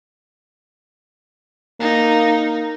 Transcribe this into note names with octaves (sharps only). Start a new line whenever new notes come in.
A#3 D#4